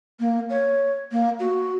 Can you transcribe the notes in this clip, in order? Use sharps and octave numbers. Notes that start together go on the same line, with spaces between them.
A#3
C#5
A#3
F#4